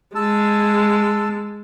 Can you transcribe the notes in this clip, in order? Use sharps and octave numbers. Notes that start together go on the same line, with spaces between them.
G#3 A5 E6